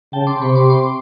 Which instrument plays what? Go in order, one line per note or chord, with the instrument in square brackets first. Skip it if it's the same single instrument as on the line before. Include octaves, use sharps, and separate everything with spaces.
[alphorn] C#3 [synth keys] G5 A5
[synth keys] C6 D6
[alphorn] C3 [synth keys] B5 C#6
[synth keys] C6 D6
C6 D6